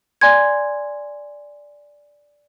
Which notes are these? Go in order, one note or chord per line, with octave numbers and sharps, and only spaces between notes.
D5 G#5 C6 G#6